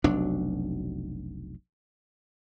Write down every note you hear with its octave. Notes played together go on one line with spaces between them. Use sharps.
F1 B1 F#3 D4